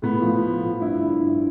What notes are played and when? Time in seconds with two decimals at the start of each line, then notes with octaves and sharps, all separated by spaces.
0.02 A2 B3
0.22 F3
0.42 A2
0.61 F3
0.81 G2 E4
1.00 D3
1.20 G2